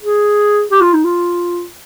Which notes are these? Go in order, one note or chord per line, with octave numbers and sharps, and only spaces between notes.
G#4
G4
F4
D#4
F4